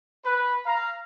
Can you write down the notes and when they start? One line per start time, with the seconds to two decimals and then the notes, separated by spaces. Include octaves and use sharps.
0.24 B4
0.65 F5 A#5